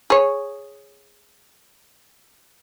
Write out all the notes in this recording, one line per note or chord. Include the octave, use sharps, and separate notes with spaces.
G#4 C#5